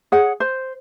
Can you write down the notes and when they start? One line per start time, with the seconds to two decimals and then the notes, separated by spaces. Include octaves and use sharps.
0.12 G#4 C#5 F#5
0.40 C5